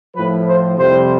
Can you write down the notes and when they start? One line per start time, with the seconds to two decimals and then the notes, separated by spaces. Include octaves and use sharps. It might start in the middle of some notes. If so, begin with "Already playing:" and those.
0.15 A2 F3 B4
0.47 C5
0.77 F2 C3 G3 C5